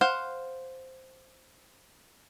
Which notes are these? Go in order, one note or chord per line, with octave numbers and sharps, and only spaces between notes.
C5 F5 F#5